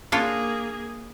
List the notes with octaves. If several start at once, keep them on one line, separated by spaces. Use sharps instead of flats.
A#3 D4 F4 G#4 C#5